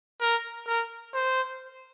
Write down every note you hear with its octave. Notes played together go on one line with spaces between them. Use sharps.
A#4
A#4
C5